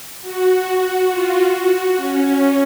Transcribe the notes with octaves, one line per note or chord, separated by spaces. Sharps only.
F#4
F4
F#4
C#4